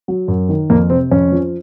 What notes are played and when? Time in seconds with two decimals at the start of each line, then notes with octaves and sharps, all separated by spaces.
0.08 F#3
0.28 F#2
0.49 D#3
0.70 F2 A#3
0.90 C3 C4
1.11 F2 C#4
1.32 F3